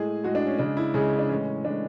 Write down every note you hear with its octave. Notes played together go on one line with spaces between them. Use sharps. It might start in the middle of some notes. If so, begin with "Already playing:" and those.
Already playing: A2 G#3 G#4
A2 G#3 F#4
D4
C#4
C#3 G#3 D4
E4
C#3 G#3 G#4
D4
A2 E3 G#3 C#4
A2 E3 G#3 D4